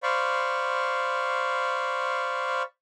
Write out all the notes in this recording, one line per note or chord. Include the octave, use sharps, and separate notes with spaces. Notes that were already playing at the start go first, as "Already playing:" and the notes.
C5 D5 F5 B5 C#6